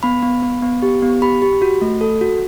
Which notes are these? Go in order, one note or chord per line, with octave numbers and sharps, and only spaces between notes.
B3 B5
B3
B3
B3
G4
B3
G4 B5
G4
F#4
A3
A4
F#4